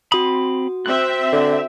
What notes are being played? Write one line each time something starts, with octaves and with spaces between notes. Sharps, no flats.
C4 F#4 B5 D#6
C4 E5 F#6
D3